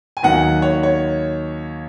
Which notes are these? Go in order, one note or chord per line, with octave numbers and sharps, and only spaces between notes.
G#5
D#2 D#3 F#3 F#5
C#5
C#5